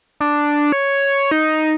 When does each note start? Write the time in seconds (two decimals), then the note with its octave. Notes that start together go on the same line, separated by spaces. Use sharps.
0.20 D4
0.72 C#5
1.31 D#4